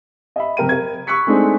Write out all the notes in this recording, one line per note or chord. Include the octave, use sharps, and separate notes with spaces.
D#5 E5 B5
F#1 C3 A#4 G5 D#7
A#4 G#6
B5 C#6 E6 F#6 B6 C#7
G#3 A3 C4 D4 D#4 G#4